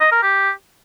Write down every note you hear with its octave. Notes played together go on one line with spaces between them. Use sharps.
D#5
A#4
G4